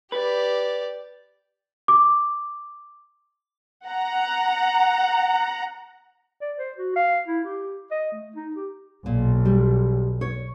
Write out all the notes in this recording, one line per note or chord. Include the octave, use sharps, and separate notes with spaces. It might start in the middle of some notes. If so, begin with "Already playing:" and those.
G4 B4 D5
D6
F#5 A#5
D5
C5
F#4
F5
E4
G4
D#5
A3
D#4
G4
B1 A#2
G3
C#5